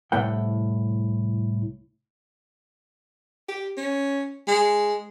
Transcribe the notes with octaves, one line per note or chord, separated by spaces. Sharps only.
C2 A2 F#5 G5
G4
C#4
G#3